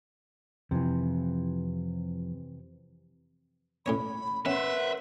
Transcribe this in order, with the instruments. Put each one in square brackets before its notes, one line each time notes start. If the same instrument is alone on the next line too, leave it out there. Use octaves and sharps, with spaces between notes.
[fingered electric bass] F2 [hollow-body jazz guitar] C3 E3
[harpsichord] A2 C#4 C#5 [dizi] B5
[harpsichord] C#4 [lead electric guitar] B4 C5 [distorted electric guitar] E5 [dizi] F#5